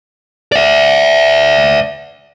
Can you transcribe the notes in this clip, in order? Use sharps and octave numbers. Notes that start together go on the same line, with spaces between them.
D5 E5